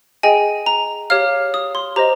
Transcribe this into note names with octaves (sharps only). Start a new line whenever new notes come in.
G#4 D#5 G5 G#5
A#5
G4 C#5 F5 F6
D#6
C6
G4 C5 D#5 A#5